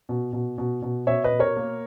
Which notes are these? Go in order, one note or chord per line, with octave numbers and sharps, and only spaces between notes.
B2
B2
B2
B2
B2 C#5 E5
B4 D#5
B2
A#4 C#5
A#3